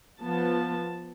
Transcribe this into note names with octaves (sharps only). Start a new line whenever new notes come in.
F3 B3 A5